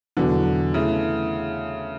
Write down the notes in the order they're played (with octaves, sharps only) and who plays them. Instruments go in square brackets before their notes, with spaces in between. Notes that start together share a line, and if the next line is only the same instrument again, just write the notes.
[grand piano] E2 B2 F#3 B3 D4 [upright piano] D3
[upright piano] C#3 [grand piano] E3 A3 E4